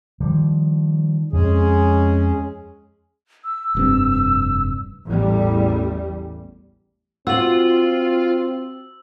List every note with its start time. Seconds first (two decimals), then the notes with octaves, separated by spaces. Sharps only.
0.20 D#3 F3 G3
1.33 F2 G#3 C#4 G#4
3.45 E6
3.75 F1 G2 C4
5.06 A1 E2 G3
7.27 C4 F4 F#4 E6 F#7